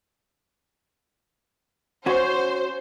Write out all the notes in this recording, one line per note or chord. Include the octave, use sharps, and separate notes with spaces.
C#4 F#4 C5